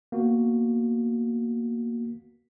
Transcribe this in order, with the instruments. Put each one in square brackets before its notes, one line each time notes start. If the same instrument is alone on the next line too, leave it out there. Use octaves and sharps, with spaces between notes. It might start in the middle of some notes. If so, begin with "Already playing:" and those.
[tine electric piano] A#3 B3 F#4